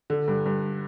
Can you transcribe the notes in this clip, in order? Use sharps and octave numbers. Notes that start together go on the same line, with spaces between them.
D3
G2
G2